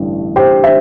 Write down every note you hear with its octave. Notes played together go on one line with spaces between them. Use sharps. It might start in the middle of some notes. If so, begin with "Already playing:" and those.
Already playing: A1 G2 D3
G4 C5
C5 E5